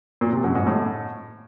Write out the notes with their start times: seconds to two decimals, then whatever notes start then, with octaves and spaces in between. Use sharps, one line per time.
0.21 A#2
0.33 C3
0.44 F#2
0.55 G#2
0.66 A2